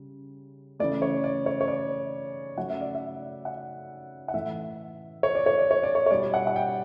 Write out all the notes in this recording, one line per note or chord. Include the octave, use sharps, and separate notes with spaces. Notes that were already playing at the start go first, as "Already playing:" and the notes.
Already playing: C#3 G3
C#3 E3 A3 D5
C#5
D5
C#5
C#5
D5
C#3 F#3 A3 F#5
E5
D5
E5
F#5
F#5
A2 E3 A3 E5
C#5
D5
C#5
D5
C#5
D5
C#5
C#5
B2 G3 D5
F#5
F#5
G5